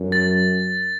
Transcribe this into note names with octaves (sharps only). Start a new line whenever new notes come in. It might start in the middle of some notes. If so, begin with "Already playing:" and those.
Already playing: F#2
A6